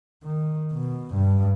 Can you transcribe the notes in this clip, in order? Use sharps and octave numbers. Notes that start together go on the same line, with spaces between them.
D#3
B2
G2